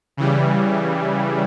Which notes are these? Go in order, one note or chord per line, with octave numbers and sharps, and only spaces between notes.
C#3 E3 G3